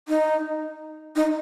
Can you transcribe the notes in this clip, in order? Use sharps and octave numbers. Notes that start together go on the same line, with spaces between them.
D#4
D#4